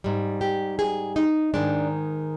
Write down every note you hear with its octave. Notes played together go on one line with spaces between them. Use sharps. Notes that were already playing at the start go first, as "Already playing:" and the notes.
G#2 G3
G4
G#4
D#4
G#2 D#3 G#3 D4